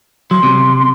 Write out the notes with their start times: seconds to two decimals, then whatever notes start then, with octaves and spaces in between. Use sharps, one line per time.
0.31 F#3 C6
0.43 C3